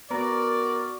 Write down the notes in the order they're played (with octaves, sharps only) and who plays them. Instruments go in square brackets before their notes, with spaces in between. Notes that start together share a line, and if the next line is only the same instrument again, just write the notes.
[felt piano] B3 [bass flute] F#4 [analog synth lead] A#4 [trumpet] D5